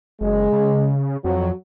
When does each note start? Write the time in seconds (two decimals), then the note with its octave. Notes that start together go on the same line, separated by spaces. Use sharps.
0.21 F#1 G#3
0.52 C#3
1.24 F2 F#3